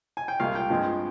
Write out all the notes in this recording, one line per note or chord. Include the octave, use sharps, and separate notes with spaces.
G#5
G5
C2 C3 F3 G#3 F5
G5
G2 F3 G#3 C4